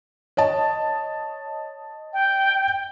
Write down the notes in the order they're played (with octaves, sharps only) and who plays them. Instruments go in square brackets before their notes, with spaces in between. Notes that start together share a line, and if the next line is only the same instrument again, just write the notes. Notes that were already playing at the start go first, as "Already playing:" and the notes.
[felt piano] C#5 D#5 A5
[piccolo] G5